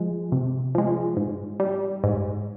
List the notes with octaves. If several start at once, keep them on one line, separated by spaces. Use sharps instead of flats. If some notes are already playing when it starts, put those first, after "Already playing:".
Already playing: F3 G#3
C3
F3 G#3
G#2
G3
G#2